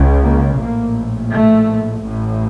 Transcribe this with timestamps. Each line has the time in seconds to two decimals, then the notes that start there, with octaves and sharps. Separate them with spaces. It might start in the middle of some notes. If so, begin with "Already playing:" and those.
Already playing: C#2 C#3
0.24 A#3
0.60 A#1 A2 A#3
1.32 A3
2.04 A1 A2